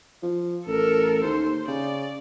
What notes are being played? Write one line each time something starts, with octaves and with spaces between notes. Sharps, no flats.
F3
A1 A4 A#4
D#2 C5
C#3 D5